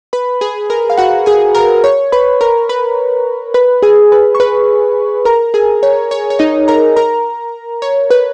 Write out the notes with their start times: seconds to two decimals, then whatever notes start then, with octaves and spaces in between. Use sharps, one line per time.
0.13 B4 B5
0.41 G#4 G#5
0.70 A#4 A#5
0.90 F5
0.98 F#4 F#5
1.26 G#4 G#5
1.55 A#4 A#5
1.84 C#5 C#6
2.12 B4 B5
2.41 A#4 A#5
2.69 B4 B5
3.54 B4 B5
3.82 G#4 G#5
4.12 B4 B5
4.35 C#6
4.40 B4 B5
5.25 A#4 A#5
5.54 G#4 G#5
5.83 C#5
6.11 C#5
6.30 C#5
6.39 D#4 D#5
6.68 A#4 A#5
6.96 A#4 A#5
7.82 C#5
8.10 B4